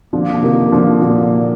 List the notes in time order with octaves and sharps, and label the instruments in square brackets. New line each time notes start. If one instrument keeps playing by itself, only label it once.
[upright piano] D3 F3 [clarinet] A#3
[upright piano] F3
C3 D#3
D3 F3
A#2 D3